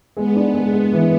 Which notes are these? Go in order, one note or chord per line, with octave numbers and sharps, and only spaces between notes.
G#3 B3
D4
G#3
G#3
E3